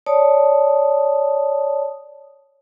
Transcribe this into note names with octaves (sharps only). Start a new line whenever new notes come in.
C#5 D5 A5 D#6